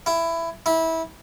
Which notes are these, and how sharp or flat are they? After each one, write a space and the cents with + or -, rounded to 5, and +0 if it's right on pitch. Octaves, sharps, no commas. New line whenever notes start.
E4 +15
E4 -20